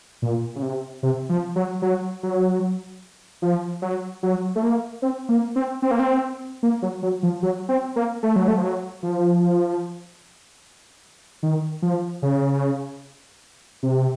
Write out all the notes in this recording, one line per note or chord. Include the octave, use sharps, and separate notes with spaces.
A#2
C#3
C3
C3
F3
F#3
F#3
F#3
F3
F#3
F#3
A3
A#3
C4
A#3
C4
C4
A#3
C4
A#3
F#3
F#3
F3
F#3
C4
A#3
A3
F#3
A3
F3
F#3
F3
D#3
F3
C#3
C3